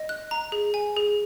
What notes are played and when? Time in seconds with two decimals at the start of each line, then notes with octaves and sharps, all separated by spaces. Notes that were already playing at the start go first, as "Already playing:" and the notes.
Already playing: D#5
0.09 F#6
0.31 A#5
0.52 G#4
0.74 G#5
0.97 G#4